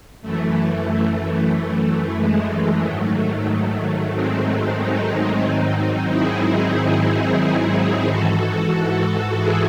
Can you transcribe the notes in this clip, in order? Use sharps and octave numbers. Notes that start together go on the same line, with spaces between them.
F#2 E3 A3
A3
A3
G#3
G#2 D#3 F#3 A3
G#3 C4
C4 D#4
G#2 D#3 F#3
E4 G#4
E4 G#4
E4 G#4
G#2 E3 F#4 A4
F#4 A4
E4 G#4